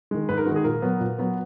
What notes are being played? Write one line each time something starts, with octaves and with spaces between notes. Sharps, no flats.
D#3 G#3
G#2 B4
A#4
D#3 G#3 F#4
G#4
A#2 A#4
F#3 B3
A#2
F#3 B3